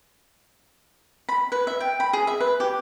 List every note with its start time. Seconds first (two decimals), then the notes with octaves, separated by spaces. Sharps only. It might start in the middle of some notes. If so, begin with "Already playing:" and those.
1.29 B5
1.52 B4
1.67 E5
1.80 G5
2.00 B5
2.13 G#4
2.27 E5
2.40 B4
2.60 G4